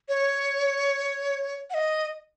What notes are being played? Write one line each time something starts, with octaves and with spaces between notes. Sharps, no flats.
C#5
F#5
D#5